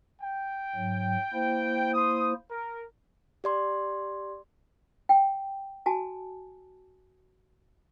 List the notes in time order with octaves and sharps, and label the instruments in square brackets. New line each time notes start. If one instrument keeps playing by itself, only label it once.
[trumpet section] G5
[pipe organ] G#2 F#3
A#3 E4 C5
[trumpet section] C6 D#6
A#4
[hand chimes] G4 D5 C6
[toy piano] G5
F#4 G#5 A5